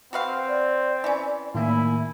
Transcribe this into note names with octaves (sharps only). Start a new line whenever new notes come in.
C4 F#4 B4 F5
D5
E3 C#4
A2 D#3 A#3 E4 G#5